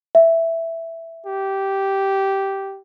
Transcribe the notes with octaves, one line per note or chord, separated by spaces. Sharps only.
E5
G4